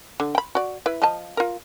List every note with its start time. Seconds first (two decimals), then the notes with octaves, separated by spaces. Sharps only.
0.20 D3
0.35 G5 B5
0.55 F#4 D5
0.86 E4 B4
1.02 F3 D#5 A5
1.37 F4 A#4